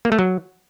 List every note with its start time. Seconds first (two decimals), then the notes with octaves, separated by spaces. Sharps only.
0.05 A#3
0.12 A3
0.19 F#3